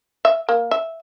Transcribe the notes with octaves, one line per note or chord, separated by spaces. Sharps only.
E5
A#3
E5